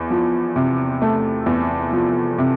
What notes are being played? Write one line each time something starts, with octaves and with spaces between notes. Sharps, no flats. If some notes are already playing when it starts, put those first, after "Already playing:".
Already playing: E2
F3
C3
A3
E2
F3
C3